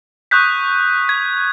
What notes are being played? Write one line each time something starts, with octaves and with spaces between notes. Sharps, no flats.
C#6 D#6 F#6 G6 B6
G#6